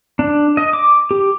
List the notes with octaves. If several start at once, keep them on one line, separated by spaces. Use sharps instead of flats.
D4
D#5
D6
G4